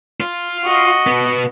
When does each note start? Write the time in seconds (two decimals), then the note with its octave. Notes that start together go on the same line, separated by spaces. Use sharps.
0.20 F4
0.64 F#4 D#5
1.07 B2 B3